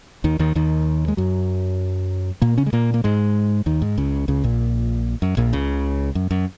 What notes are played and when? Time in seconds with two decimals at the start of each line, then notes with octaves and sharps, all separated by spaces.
0.24 D#2 D#3
0.39 D#2 D#3
0.55 D#2 D#3
1.08 G#3
1.17 F#2 F#3
2.42 A#2 A#3
2.57 C#3 C#4
2.66 G#3
2.73 A#2 A#3
2.94 A#3
3.04 G#2 G#3
3.66 D#2 D#3
3.82 G#2
3.97 C#2 C#3
4.28 C#2 C#3
4.43 A#1 A#2
5.22 F#2
5.37 A#1 A#2
5.53 C#2 C#3
6.15 F#2
6.31 F#2